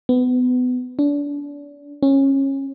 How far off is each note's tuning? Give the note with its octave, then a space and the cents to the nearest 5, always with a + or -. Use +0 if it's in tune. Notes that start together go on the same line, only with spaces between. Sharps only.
B3 +25
D4 -35
C#4 -20